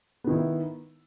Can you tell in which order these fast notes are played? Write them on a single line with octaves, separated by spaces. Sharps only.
B3 D#3 E4